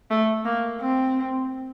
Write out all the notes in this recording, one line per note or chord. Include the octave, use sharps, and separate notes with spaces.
A3
A#3
C4